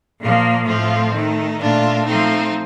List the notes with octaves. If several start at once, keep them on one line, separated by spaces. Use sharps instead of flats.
A#2 F3 A#3
A2 F3 A3 C4 F4
D#3 A3 D#4
A#2 A3 D4 F4
F3 A3 C4 D#4